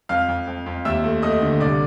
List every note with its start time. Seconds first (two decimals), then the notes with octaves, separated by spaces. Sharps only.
0.09 F2 F5 F6
0.28 F2
0.47 F2
0.66 F2
0.85 D#2 E5 E6
1.04 A3
1.22 A3 D#5 D#6
1.42 D3
1.60 C2 D5 D6